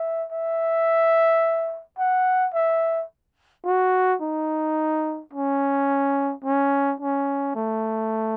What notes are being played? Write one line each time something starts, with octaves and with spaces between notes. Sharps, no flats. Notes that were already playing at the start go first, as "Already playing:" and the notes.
Already playing: E5
E5
F#5
E5
F#4
D#4
C#4
C#4
C#4
A3